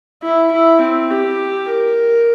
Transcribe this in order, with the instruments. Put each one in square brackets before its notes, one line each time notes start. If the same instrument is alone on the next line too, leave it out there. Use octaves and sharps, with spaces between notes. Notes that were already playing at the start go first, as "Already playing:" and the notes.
[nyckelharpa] E4
E4
C4
G4
A#4